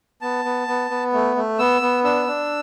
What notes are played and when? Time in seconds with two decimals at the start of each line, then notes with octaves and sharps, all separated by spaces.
0.22 B3 A5
0.45 B3
0.68 B3
0.90 B3
1.13 A3
1.36 A3
1.59 B3 E6
1.81 B3
2.04 D4 E6
2.27 D4